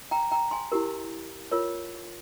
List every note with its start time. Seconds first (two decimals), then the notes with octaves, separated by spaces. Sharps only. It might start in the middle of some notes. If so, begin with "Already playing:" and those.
0.11 G5 A#5
0.31 G5 A#5
0.51 G#5 C6
0.72 E4 G4 A#4
1.52 F4 A#4 C#5